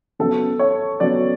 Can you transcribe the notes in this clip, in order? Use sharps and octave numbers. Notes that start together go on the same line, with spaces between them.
C#3 F#3 B3 A4
C#5
C#3 F#3 B3 D5